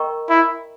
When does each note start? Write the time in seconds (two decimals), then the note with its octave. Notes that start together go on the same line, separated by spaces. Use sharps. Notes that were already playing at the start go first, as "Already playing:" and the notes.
Already playing: A#4 D#5 G5 A#5 C#6
0.30 E4